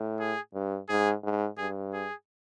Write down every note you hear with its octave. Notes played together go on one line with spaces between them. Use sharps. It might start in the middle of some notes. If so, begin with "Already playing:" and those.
Already playing: A2
G#4
G2
G#2 G#4
G#2
G2 G#4
G#4